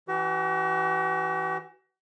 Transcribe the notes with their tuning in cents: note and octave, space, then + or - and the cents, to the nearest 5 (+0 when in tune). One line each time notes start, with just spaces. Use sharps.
E3 +0 F#4 +45